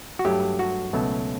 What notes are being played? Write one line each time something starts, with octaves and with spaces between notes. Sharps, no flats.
F#4
G2 F#3 A3 G4
F#4
C#2 B2 F#3 A3 C#4